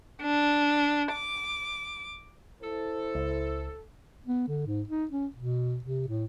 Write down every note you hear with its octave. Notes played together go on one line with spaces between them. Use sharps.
D4
D6
E4 A4 C5
C#2
B3
D3
G#2
D#4
C#4
B2
C3
A2